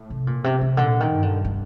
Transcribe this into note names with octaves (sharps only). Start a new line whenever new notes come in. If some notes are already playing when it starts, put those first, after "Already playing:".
Already playing: A2
C3
A#2
C3
C3
A#2 D3
D#3
G2
D3
D3